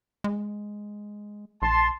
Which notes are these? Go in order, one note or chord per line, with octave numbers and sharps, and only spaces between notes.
G#3
A#1 A5 C6